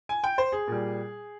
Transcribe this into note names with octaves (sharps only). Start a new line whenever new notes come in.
G#5
G5
C5
G#4
A#2 G3